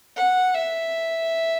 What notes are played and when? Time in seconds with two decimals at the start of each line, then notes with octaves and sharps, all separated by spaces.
0.16 F#5
0.55 E5